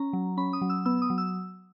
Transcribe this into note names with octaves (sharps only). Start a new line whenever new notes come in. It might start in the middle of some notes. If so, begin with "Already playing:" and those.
Already playing: C#4 A#5
F#3
C#4 B5
D#6
F#3
E6
B3 E6
D#6
F#3
E6